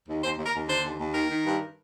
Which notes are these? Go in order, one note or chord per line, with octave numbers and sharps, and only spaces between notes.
D#2
D#2 C5
D#2
A#4
D#2
D3 C5
D#2
D#2
D#3 A#4
D#3
G2